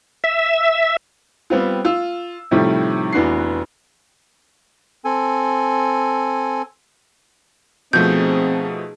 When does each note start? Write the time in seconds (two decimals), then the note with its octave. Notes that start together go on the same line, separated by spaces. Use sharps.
0.24 E5
1.50 G3 B3 C4 F4
1.85 F4 E6
2.51 A2 C3 D#3 F3 G3 A3
3.13 F1 E3 B3 D4 F#4 C7
5.05 C4 A4 G#5
7.93 B2 F3 A3 C4 D#4 G#4 G6